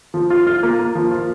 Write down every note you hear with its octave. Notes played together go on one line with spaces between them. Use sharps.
F3
F4
F4
A#3
A#3
F3
F4